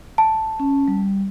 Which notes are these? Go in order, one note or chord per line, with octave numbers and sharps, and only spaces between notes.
A5
C#4
G3